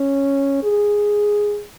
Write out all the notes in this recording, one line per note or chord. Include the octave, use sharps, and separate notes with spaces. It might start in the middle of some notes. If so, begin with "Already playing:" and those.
Already playing: C#4
G#4